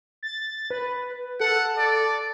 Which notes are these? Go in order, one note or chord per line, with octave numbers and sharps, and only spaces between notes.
A6
B4
A4 F#5
D5